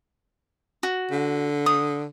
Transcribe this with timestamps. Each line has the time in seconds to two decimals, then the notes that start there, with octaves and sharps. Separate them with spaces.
0.83 F#4
1.11 D3
1.66 D#6